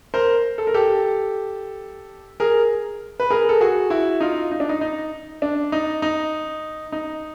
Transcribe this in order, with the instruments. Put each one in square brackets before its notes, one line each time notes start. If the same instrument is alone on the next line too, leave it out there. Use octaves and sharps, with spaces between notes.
[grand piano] A#4 C5
A4
A#4
G4 A4
G#4 A#4
B4
G#4 A#4
A4
F#4 G#4
E4 F#4
D#4 F4
D#4
D4
D#4
D#4
D4
D#4
D#4
D#4